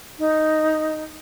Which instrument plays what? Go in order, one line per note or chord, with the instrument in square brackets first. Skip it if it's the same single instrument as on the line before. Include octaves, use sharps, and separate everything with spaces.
[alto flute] D#4